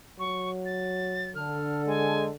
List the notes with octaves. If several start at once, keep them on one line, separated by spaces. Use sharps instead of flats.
F#3 C#6
A6
D3 A4 F6
G#3 G#5